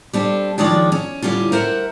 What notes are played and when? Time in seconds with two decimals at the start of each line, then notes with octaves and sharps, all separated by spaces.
0.13 G3 C4 D4 A4
0.58 D#3 F3 G#3 D4 C#5 D5
0.92 C#4
1.22 A2 D3 G3 C#4 F4
1.52 A#4 C5 E5 F#5